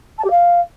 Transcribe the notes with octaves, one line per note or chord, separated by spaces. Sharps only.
A5
G4
F5